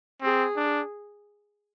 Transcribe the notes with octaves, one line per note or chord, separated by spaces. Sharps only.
C4 G#4
D4